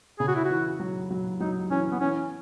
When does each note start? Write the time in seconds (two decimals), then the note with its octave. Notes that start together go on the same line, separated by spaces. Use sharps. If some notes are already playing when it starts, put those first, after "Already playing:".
0.19 C#3 G#4
0.28 F#4
0.35 E4
0.44 F#4
0.51 E3
0.80 F#3
1.11 F#3
1.40 F#3 D#4
1.71 E3 C#4
1.91 B3
2.00 E3 C#4